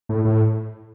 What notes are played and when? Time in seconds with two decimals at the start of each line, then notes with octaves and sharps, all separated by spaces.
0.09 A2
0.25 A2